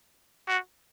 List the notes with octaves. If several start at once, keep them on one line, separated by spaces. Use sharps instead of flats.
F#4